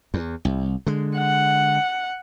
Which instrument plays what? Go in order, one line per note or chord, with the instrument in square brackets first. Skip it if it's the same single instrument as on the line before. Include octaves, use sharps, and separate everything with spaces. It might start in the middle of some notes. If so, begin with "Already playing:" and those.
[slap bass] E2
C2
D3 G#3
[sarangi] F#5